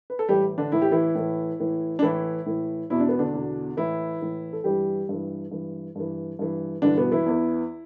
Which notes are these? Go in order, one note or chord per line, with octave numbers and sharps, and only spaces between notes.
B4
A4
A2 E3 G3 G4
D3 D4
A2 E3 E4
G4
E3 E4
A2 E3
A2 E3
D4
A2 E3 E4
A2 E3
E2 B2 E4
D4
B3
D3 D4
E2 B2
A2 E3 E4
A2 E3
A4
G2 E3 G3 G4
G2 E3
G2 E3
G2 E3
G2 E3
G2 D3 E3 D4
B2 B3
E3 E4
E2 E3